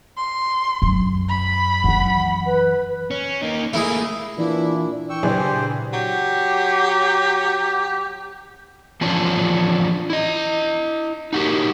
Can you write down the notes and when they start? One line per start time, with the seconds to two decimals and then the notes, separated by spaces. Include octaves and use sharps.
0.17 C6
0.82 F#2
1.29 B5
1.84 F#2 E3 F#5
2.46 B4
3.11 C#4
3.42 A#3 D#4
3.73 A3 A#3 E4 G#4
4.38 A#2 E3 D4 E4
5.10 G5 C#6 E6
5.23 A#2 C#3 E3 F#3 D4 G4 G#4 C5
5.93 F#3 G4
9.01 E3 F3 C#4 D4 F4
10.10 E4 D#5
11.33 D#4 F#4 G4 A#4